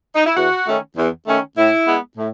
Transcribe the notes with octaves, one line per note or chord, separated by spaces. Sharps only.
D#4
E4
E2 F#4
D#3 A3 C#4
E2
D#3 A3 C#4
A2 E4
G#3 B3
A2